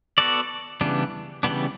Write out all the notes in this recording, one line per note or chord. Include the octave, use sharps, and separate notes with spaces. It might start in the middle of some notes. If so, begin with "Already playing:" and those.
B3 F#4 A4 D5
C#3 E3 G3 B3 D4
C#3 E3 G3 B3 D4